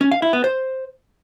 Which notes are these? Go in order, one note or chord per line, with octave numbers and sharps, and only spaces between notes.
C#4
F5
E4
B3
C5